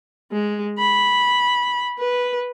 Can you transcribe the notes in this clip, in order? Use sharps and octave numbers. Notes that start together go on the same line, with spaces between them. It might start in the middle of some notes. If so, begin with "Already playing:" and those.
G#3
B5
B4